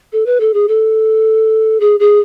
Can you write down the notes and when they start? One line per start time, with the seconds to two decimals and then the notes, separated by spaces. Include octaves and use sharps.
0.12 A4
0.26 B4
0.40 A4
0.54 G#4
0.68 A4
1.80 G#4
2.00 G#4